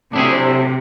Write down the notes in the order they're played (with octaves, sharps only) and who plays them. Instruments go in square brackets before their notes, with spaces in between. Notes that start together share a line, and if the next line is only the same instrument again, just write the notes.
[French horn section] A2 F#3 C4 [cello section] C3 [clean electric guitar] D4 E4 G#4